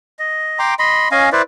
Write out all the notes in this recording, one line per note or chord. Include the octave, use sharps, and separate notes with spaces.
D#5
G5 A#5 C6 D6
D#5 B5 C6
C#4 D#5 F5 G#5
E4 B4 C5 D5